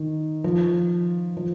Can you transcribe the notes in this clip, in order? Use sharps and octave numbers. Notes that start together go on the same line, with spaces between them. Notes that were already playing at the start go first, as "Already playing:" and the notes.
Already playing: D#3
F3
F3